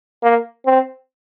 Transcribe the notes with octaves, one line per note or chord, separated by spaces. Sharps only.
A#3
C4